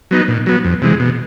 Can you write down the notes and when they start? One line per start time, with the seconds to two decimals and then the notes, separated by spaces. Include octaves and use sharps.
0.11 F#3 B3 D#4
0.28 A#2
0.46 F#3 B3
0.65 F2
0.82 C3 E3 G#3
1.00 B2